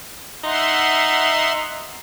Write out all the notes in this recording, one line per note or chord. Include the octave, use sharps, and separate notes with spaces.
D#4 E5 F#5 C6